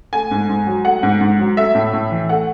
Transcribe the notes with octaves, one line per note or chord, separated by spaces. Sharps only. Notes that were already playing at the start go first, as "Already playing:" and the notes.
A3 G#5
G#2
G#2
F#3
A3 F#5
G#2
G#2
F#3
A3 E5
A2
A2
E3
A3 F#5